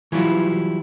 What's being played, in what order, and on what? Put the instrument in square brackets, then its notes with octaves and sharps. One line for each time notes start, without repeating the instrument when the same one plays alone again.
[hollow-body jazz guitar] E3 F#3 G3 E4 F4